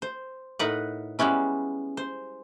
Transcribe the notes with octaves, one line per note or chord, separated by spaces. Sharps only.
C5
A2 D#4 A#4 B4 F#5
G3 G#3 B3 C#4 E4
C5